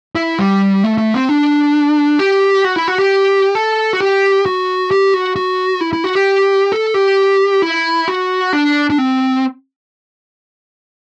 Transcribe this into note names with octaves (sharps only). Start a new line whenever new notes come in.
E4
G3
A3
A3
C4
D4
G4
F#4
E4
F#4
G4
A4
F#4
G4
F#4
G4
F#4
F#4
E4
E4
F#4
G4
A4
G4
E4
F#4
D4
D4
C4